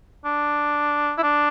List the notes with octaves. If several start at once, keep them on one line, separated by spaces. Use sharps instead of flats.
D4
E4
D4